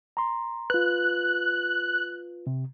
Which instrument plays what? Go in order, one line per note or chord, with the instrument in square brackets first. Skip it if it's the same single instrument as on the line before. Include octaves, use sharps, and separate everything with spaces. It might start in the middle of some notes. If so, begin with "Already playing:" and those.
[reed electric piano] A#5 C6
[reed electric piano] F4 B4 [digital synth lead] F#6
[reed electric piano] C3